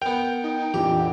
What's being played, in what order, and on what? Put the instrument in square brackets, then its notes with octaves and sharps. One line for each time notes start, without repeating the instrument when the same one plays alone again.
[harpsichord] B3 A#4 [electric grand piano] G5
[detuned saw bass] D#4
[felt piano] F2 A#2 D4 [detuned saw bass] E3 [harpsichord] G4
[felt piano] A4 F#5